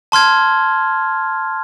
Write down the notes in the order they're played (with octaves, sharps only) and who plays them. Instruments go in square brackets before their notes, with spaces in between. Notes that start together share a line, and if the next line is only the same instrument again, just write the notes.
[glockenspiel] A5 C6 F6 G#6